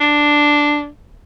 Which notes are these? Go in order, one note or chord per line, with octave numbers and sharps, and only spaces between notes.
D4